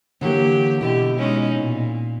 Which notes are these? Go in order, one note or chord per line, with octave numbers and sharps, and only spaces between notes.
D3 E3 F#3 A#3 G4
B2 D3 E4 G4
G#3 C#4 D#4
A#2